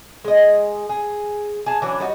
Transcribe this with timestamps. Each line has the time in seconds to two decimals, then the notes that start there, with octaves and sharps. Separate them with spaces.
0.24 G#3 D#5
0.89 G#4
1.66 G#4 A5
1.82 E3 F#3 C#4 D4
2.00 G3 D#4 F#4